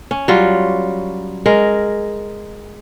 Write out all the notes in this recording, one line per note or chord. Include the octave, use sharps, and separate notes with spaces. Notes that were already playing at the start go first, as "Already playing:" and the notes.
C#4
F#3 G3 F4
G#3 A#4